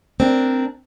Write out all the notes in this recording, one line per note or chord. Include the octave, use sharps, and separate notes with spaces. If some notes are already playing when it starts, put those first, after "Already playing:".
C4 D4 A#4